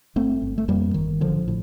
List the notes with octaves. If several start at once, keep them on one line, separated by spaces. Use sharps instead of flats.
G1 A3 C4
G1
A3
F2 G3 A#3
G1 D#3
A1 D3 F3
A2